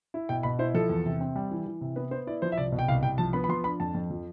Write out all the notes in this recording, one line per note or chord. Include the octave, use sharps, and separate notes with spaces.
E4
B2 G5
B2 B5
E4 C5
F3 A4
E2
C3
C4
G3
E3
E3
C3
B3 B4
B3 C5
E4 D5
F3 C5
E5
C2 D5
B2
G5
C2 F5
C2 G5
F3 A5
B3 B5
B5
F3 C6
D4 B5
F2 A5
F2
F3